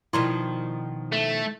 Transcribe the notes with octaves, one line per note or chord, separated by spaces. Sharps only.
B2 D#3 F3 E4 D5 C6
A3